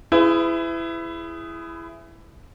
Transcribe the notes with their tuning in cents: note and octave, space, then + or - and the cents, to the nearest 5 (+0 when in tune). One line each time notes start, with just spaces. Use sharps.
E4 +15 G#4 +0 B4 +40